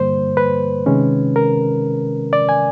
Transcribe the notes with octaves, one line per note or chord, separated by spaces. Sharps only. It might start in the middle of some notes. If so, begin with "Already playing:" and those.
Already playing: G2 D3 G3 A#3 C5
B4
C3 D#3 G#3 C#4
A#4
D5
G#5